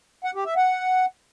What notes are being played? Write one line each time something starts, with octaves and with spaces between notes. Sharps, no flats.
F#5
G4
E5
F#5